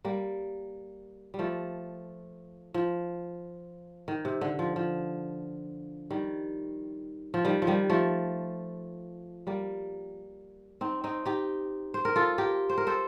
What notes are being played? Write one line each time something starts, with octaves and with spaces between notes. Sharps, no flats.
G3 A#3
G3
F3 A3
F3
D#3
C3
D3
F3
F3
D#3 G3
F3
D#3 G3
F3
D#3 G3
F3 A3
G3 A#3
C4 D#4
C4 D#4
D#4 G4
C5
A#4
F4 A4
G4 A#4
C5
A#4
A4 C5